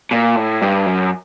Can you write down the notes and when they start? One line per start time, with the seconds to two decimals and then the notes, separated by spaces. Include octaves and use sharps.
0.13 A#2
0.37 A2
0.62 G2
0.86 F#2